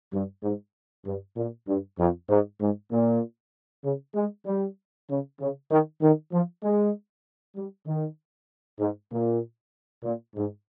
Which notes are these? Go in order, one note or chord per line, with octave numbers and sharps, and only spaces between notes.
G2
G#2
G2
A#2
G2
F2
G#2
G#2
A#2
C#3
G#3
G3
C#3
C#3
D#3
D#3
F3
G#3
G3
D#3
G#2
A#2
A#2
G#2